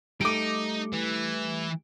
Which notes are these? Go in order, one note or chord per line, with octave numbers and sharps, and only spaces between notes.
G3 A3 D#4 D6 D7
E3